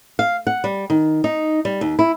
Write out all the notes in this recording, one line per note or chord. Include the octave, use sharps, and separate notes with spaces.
F5
F#5
G3
D#3
D#4
G3
D#2
E4